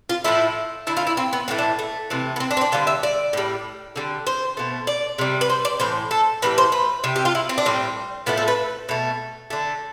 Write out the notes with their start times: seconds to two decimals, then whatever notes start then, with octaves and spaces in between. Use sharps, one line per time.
0.09 F4
0.24 A2 F3 A3 E4
0.87 D3 A3 E4
0.97 F4
1.07 E4
1.17 C4
1.33 B3
1.48 A2 E3 A3 C4
1.58 D4
1.79 A3
2.10 C3 E3 A3
2.36 B3
2.40 C4
2.51 D4
2.57 C4
2.61 D4
2.72 D3 G3 F4
2.87 E5
3.03 D5
3.33 A2 G3
3.96 D3 G3
4.27 C5
4.57 B2 A3
4.87 D5
5.18 C3 G3
5.41 B4
5.50 C5
5.65 D5
5.80 A2 E3 C5
6.11 A4
6.42 A2 E3 G3 B4
6.58 C5
6.72 B4
7.04 C3 G3
7.16 G4
7.25 F4
7.35 E4
7.49 C4
7.58 D4
7.65 A2 G3 C4
8.26 A2 F3 A3 B3
8.37 A4
8.48 B4
8.89 B2 A3
9.50 D3 A3